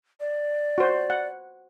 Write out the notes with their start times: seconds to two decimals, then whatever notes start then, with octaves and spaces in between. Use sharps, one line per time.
0.20 D5
0.78 F#4 C5
1.10 F#5